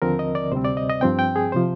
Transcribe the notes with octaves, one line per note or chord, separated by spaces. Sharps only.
D#2 D3 F3 C4 A#4
D#5
D5
D2 C3 G3 C4 C5
D5
D#5
D#5
G2 F3 C4 G5
G5
G#4
C3 F3 C5